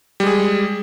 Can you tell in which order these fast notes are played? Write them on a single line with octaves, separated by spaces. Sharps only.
G3 G#3 G#4